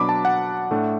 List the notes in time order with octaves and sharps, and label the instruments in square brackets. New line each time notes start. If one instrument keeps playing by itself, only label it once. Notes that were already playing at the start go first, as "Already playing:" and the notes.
Already playing: [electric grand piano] B2 F#3 D4 B5 D6
A5
F#5
A2 A3 D4